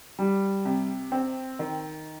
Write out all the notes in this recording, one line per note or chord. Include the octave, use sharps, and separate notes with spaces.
G3
C3
C4
D#3